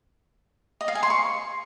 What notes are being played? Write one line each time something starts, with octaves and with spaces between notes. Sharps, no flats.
D#5
F5
G#5
C6
C#6